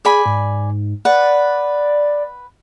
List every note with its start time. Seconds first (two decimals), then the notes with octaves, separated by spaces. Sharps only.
0.05 G#4 D5 G#5 B5
0.26 G#2
1.05 B4 D5 F#5